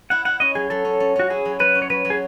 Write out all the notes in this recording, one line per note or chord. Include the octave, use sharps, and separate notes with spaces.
E4 F#5
E4 F#5
C#4 D#5
F#3 G#4
F#3 A4
C#4
C#4
C#4 F#4
E4 G#4
F#3
F#3 B4
C#4
C#5
F#3 B4
F#3
G#4